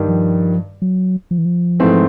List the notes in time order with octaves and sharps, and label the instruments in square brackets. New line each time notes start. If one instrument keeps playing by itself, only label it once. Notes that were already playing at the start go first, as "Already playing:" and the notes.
Already playing: [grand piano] G2 D#3 G3
[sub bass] F3
F#3
F3
E3
F3
[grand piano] G#2 E3 A3 C4